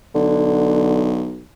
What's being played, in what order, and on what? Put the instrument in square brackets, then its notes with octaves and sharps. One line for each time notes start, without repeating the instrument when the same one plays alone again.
[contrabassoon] B1 [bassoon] D3